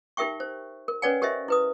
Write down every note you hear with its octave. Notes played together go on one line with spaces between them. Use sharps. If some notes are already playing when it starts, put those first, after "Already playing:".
D#4 G4 A#4 E5 G5 C#6
C5
A#4
C#4 B4 C#5 D5 F#5 G#5
G4 A#4 C5 D#5 E5
E4 B4 D#6